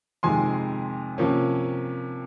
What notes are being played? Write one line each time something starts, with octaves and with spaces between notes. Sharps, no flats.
F2 C3 D#3 G#3 G#5 C6
C3 F3 A#3 C#4